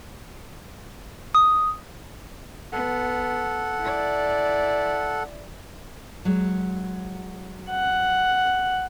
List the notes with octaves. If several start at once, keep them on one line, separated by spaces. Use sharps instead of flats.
D#6
B3 A4 F#5
E4 D5
F#3 G#3
F#5